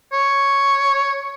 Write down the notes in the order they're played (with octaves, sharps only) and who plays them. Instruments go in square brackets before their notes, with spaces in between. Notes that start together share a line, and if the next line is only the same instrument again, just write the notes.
[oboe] C#5